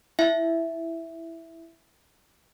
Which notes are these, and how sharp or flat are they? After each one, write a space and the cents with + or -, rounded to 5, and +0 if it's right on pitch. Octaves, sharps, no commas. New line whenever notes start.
E4 +0 E5 +0